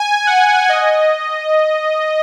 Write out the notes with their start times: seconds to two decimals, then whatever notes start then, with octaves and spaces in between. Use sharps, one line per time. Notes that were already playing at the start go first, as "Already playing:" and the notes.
Already playing: G#5
0.27 F#5
0.69 D#5